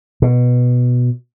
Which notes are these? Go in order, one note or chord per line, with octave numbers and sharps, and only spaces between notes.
B2